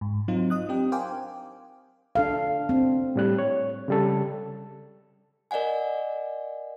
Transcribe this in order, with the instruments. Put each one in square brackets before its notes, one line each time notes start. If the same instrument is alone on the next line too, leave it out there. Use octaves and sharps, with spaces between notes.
[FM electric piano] G#2
F#3 C4 D#4 F4
D#5 D#6 F#6
C4 D4 D#4 G4 G5
A#4 C5 F5 G5 G#5 D6
[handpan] D4 A4 F5
C4
[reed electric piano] A2 G3 F#6
C#5
C#3 G3 A4
[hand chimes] A#4 D5 D#5 F#5 G#5